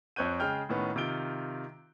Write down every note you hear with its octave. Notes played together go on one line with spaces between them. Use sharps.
F2 C4 C#5 F#6 G6 D#7
C#3 G#3 G5 F6 G6
A2 D#3 B3 C#4
C3 D#3 F4 D7 G7